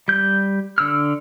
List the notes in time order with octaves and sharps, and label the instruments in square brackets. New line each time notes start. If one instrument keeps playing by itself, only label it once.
[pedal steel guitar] G3 G6
D3 E6 F6